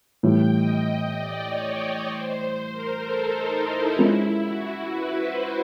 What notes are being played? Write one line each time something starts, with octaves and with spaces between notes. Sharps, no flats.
A2 E3 G3 G5
D#5
D#5
D5
C#5
D5
C5
A#4
A4
D#4
E4
G#3 C#4 E4 F4 A#4
F#4
B4
C5